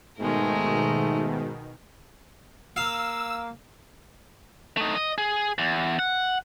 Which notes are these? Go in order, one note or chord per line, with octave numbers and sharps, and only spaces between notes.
G#2 B2 D#3 G#3 A3 A#4
A#3 F5 E6
A3 D#4
D#5
G#4
E2
F#5